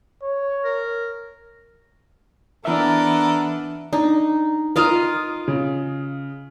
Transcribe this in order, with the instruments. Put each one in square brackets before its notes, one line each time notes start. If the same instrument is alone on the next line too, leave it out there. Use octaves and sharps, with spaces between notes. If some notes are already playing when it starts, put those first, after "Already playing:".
[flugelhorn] C#5
[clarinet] A#4
[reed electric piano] E3 E5 [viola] B3 [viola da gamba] D4 [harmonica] A4 A#4
[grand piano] D4 [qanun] D#4
[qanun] F4 D#5 F5 [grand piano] A#4 D#6 F6
[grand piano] C#3